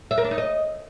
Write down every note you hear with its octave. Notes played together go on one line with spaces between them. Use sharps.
E5
A#4
D4
D#4
D#5